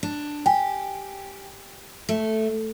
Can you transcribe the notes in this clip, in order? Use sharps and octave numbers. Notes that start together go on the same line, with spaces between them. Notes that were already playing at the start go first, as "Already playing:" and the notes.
D4
G4 G5 G#5
A3